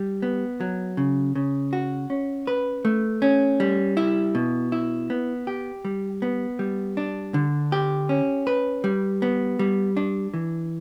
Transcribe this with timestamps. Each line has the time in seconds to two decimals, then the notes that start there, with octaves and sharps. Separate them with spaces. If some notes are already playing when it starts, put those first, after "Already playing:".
Already playing: G3
0.22 B3
0.61 F#3
0.97 C#3
1.35 C#3
1.73 F#4
2.10 C#4
2.47 B4
2.85 A3
3.22 C#4
3.60 G3
3.97 E4
4.35 B2
4.72 E4
5.10 B3
5.47 G4
5.85 G3
6.22 B3
6.59 G3
6.97 D4
7.34 D3
7.72 G4
8.09 C#4
8.47 B4
8.84 G3
9.22 B3
9.59 G3
9.97 D4
10.34 E3